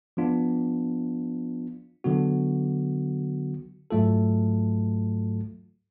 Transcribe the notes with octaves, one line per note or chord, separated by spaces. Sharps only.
F3 B3 D4 F4
D3 F#3 B3 F#4
G#2 F#3 A3 F4 A4